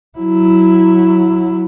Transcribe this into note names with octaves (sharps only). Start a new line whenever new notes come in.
F#3 E4